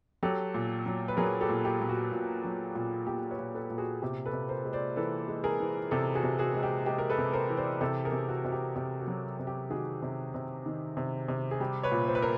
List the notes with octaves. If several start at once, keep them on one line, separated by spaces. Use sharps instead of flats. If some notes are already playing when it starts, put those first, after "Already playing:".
F#3 G4 A4
A#2
F#3
B4
F#3 G#4 A#4
G4 A4
A#2
G4
A#2
F#4
A#2
F#3
A#2
A#2 G4
B4 C#5
A#2
A4 B4
A#2
F#4 G#4
C3 G4
A4 B4
C3
A#4 C5
G#3
C5 D5
E3 A4 B4
G#3
G#4 A#4
E3
C3 G4 A4
F#4 G#4
C3
F#4 G#4
G#3
G4
G#3 G4
A#4
A4 B4
C3
A#4 C5
E3
C5 D5
C3 G4 A4
G#4 A#4
C3
F#4
C3 F#4
G4
C3 G4
F#4
F#3
C3
G4
D#3 F#4 G#4
C3
C3
D#3
C3
C3
G#4
G3 G4
B4 C#5
A#2
C5
B4
A#4 C5